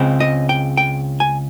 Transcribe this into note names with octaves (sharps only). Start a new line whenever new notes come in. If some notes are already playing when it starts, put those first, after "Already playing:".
Already playing: C#2 C#3 G#3 C4
D#5
G5
G5
G#5